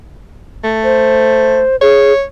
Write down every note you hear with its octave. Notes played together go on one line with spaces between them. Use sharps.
A3
C5
G#4 C#5